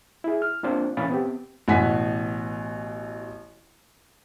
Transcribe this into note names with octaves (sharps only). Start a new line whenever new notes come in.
E4 G#4
F6
A#3 C4 D4 F4 C5
A#2 E3 C#4 F5 B5 A6
B3 C4 G4
A1 B2 F#5 G#5 B6